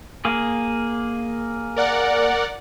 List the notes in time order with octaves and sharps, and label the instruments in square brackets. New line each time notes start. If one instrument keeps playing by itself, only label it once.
[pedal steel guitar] A#3 G#4
[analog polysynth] A#4 D5 F#5